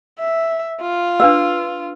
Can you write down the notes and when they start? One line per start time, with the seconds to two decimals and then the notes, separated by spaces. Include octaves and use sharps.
0.20 E5
0.81 F4
1.20 D4 B4 F5 E6